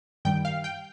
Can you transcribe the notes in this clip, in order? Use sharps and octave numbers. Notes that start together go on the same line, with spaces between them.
G2 D#3 G3 G5
F5
G5